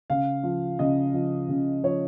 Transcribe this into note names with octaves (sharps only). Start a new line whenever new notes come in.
C#3 F5
F3
C#3 D#5
F3
C#3
F3 C#5